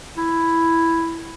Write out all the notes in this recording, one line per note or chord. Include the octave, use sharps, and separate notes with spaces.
E4